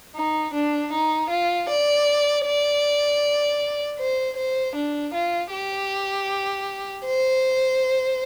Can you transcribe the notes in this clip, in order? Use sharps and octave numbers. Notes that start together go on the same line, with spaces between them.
D#4
D4
D#4
F4
D5
D5
C5
C5
D4
F4
G4
C5